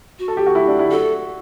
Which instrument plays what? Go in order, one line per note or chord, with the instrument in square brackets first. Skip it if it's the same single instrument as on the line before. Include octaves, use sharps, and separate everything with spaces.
[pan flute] F#4
[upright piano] A4
G4
F#4
E4
D4
E4
[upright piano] F#4 [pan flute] A4